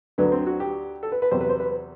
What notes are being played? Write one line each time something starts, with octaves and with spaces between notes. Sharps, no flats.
D2 D3 F#3 B3
C4
F#4
G4
A4
B4
B4
E2 C3 F#3 C5
B4
C5
B4